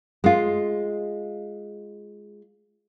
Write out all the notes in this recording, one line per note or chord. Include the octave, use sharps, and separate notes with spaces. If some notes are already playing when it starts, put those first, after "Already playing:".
G#3 F4